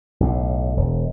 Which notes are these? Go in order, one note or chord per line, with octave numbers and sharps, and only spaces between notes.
B1 A2
E1